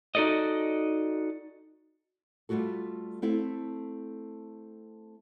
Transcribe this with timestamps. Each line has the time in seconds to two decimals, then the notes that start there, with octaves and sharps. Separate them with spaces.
0.15 D#4 F#4 A4 D5 D#5
2.49 G3 A3 A#3 F4 F#4 A4
3.22 A3 C4 E4 A4